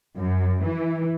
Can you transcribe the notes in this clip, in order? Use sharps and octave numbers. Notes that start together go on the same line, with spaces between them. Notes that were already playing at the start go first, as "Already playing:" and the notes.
F#2
E3